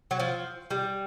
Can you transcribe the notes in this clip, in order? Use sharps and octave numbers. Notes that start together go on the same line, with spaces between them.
F#3
F3
G3